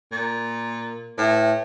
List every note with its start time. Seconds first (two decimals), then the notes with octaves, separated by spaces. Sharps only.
0.12 A#2
1.18 A2 B4 E5 G5